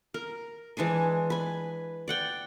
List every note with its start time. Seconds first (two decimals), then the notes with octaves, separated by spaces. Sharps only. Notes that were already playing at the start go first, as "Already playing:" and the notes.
0.14 A#4
0.77 E3 G#3 D4 G#5
1.30 B4 G#5
2.08 D5 F#5 G5